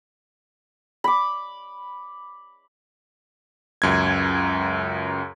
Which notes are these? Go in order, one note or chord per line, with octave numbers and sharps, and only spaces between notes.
B5 D6
C#2 F#2 G#6